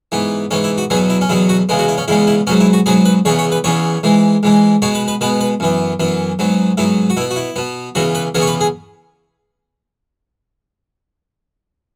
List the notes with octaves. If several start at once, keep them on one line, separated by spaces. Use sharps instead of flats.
G#2 E3 B3
G#2 E3 B3 C#4
E4
F#4
E2 B2 F#3 B3 G#4
E4
C#4
E2 B2 F#3 B3 E4
F#4
E2 C#3 G#3 B3
F#4
E4
C#4
E2 C#3 G#3 B3 E4
E4
G#2 F#3 B3 C#4
E4
F#4
G#2 F#3 B3 G#4
B4
E2 C#3 E3 B3 C#5
C#5
B4
E2 C#3 E3 B3 C#5
G#2 E3 G#3
G#2 E3 G#3
B2 G#3 B3 C#5
B4
B4
B2 G#3 B3 B4
B4
F#2 E3 B3
F#2 E3 B3
G#2 F#3 B3
G#2 F#3 B3 E4
F#4
B2 B3 E4
F#4
E4
B2 B3
E2 C#3 E3 B3 F#4
B4
E2 C#3 E3 B3 G#4
C#5
B4
G#4